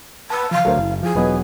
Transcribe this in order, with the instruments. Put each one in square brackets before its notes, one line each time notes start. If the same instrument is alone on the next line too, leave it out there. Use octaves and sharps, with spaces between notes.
[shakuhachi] B4 [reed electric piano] A5 E6
[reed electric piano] C#3 E3 F3 [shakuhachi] F5
[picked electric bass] D2 F#3 [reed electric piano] A4 A#4 C5
[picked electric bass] F#1 [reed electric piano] E4
[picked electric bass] F3 [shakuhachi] G#4
[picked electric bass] E1 F#3 B3 [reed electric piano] F4 B4 D#5